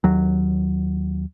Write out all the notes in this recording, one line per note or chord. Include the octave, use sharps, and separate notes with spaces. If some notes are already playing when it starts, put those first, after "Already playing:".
D#2 F#3